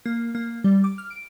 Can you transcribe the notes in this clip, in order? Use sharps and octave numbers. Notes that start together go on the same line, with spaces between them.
A#3
A#3
G3
D6
F6
D7